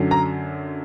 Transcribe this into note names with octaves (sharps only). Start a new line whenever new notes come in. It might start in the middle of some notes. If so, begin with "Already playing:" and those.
Already playing: F#2 D3 F#3
A#5